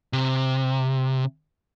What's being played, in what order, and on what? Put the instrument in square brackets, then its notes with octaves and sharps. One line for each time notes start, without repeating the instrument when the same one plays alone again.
[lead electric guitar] C3